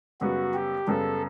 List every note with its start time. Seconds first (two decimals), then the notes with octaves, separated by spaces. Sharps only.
0.21 F#2 C#3 G3 B3 F#4
0.54 G4
0.87 F#2 C#3 G3 B3 A4